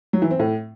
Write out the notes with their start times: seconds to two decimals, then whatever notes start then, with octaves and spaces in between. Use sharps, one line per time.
0.13 F#3
0.22 E3
0.31 C4
0.39 A2